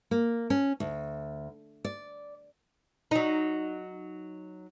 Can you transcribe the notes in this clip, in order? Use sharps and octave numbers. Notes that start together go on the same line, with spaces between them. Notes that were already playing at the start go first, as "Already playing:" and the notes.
A#3
C#4
D2
D5
F#3 D#4